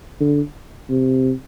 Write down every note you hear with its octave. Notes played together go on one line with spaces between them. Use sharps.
D3
C3